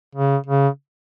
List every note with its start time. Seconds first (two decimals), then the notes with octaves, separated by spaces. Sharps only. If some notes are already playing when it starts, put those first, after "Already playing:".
0.15 C#3
0.47 C#3